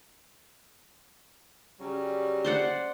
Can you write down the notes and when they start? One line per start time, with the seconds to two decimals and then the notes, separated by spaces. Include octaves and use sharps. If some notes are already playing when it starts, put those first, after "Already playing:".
1.79 C#3 F#3 G3
2.45 C5 D5 F#5